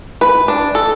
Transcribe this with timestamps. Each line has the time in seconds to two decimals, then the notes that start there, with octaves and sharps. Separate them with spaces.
0.21 B4
0.48 D4
0.75 A4